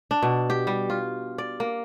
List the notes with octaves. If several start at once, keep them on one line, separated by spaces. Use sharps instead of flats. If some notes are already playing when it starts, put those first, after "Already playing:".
D4
B2
G4
G3
F4
D5
A#3